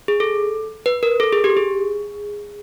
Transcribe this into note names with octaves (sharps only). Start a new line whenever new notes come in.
G#4
A4
B4
A#4
A4
G#4
G4
G#4